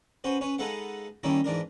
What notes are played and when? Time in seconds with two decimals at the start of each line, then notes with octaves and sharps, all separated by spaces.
0.24 C#4 F#4 B4 C5
0.41 C#4 B4 C#5
0.58 G#3 D#4 A4 B4 F5 F#5
1.23 D#3 G3 A#3 C#4 D#4 E4
1.44 G#2 E3 D4 A#4